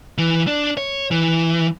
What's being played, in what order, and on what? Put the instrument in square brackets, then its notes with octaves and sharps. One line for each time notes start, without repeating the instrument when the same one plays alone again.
[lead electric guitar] E3
D4
C#5
E3